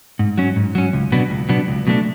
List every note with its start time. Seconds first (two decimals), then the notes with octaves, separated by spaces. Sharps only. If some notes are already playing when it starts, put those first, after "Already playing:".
0.19 G#2
0.38 F#3 C#4
0.56 G#2
0.75 F#3 C#4
0.93 C#2
1.12 B2 F#3 B3 D4
1.30 C#2
1.49 B2 F#3 B3 D4
1.68 C#2
1.87 B2 F#3 A3 D4